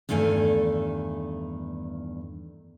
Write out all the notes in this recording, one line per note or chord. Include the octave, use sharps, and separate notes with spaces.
E2 G2 D#3 A3 G#5